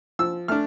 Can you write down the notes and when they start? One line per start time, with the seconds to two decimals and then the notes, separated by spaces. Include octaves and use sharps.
0.19 F3 E6
0.48 A3 D4 F6